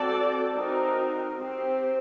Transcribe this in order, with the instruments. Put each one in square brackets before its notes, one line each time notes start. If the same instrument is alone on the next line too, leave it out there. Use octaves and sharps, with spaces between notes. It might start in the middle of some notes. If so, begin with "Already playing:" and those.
Already playing: [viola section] C4 F#4 A4 D5
C4 D#4 F#4 A#4
C4 G4 C5